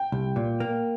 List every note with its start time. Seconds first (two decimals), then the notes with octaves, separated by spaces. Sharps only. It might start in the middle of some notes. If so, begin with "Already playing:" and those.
Already playing: G5
0.12 C2
0.36 A#2
0.60 A#3